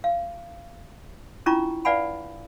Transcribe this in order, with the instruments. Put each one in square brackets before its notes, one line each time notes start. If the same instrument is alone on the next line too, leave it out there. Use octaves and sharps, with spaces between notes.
[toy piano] F5
C#4 D4 E4 F4 A#5 C#6
B4 D5 F5 F#5 G#5 B5